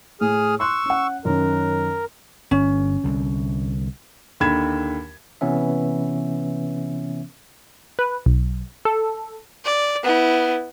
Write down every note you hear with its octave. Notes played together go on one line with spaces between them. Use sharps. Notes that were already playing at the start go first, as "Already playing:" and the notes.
A2 G#4 D#6 F6
C6 C#6 E6 F#6
C#4 F#5
F#2 D#3 C#4 A#4
G1 C#4
C2 D3
D#2 D3 B5 G#6 E7
C3 E3 B3 C#4 E5
B4
B1
A4
D5
B3 E4